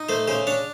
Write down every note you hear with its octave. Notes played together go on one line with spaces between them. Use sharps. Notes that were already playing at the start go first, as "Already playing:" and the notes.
Already playing: D#4
A3 C5
C#3 C5
D4 C#5